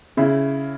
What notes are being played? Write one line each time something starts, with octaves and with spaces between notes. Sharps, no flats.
C#3 E4